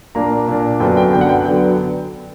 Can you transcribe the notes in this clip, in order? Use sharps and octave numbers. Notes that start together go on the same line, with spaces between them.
A#2 A#3 D4 A#5
A#2 A#3 D4
F#2 D3 F#3 B3 D4 G5
G5
F#2 D3 F#3 B3 D4 G5
F#5
G5
D3 F#3 B3 D4 G5